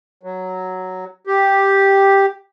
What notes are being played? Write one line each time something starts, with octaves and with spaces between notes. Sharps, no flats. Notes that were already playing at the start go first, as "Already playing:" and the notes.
F#3
G4